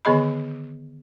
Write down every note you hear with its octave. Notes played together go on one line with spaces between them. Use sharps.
D3 D#3 B3 G#4 D#5 B5